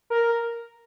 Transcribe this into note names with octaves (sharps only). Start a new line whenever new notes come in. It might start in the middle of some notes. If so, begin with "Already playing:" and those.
A#4